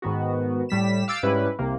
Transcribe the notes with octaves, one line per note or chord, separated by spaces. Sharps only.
G#2 D#3 B3 F#4
A2 G3 B6 E7
F5 D6 E6 G6 A6 D7
G#2 G3 C#4 E4 B4
C2 C3 A#3